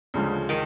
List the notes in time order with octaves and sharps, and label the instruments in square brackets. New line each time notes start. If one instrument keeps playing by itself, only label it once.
[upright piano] D2 C#3 F3 G#3
[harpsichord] D#3